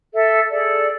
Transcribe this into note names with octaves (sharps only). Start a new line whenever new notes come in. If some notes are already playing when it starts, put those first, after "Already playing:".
A4 E5
G#4 A4 D5